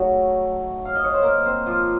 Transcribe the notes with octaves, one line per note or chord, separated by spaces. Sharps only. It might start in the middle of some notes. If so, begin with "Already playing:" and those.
Already playing: C#3 F#3 A3 D#4 F#4
F5
D#5
C#5
C5
A#3 A#4
C4 C5
F3 F4